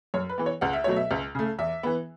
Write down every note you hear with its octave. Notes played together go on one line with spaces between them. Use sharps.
F#2 C#5
B4
E3 B3
C#5
C#2 F#5
E5
B2 F#3 A3 C#5
E5
C#2
C#3 A3
E2 E5
E3 B3